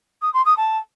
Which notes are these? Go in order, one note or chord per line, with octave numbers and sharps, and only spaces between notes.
D#6
C6
D#6
A5